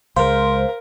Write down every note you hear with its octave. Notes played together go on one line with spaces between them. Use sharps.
C#2 G#3 A#4 C5 F5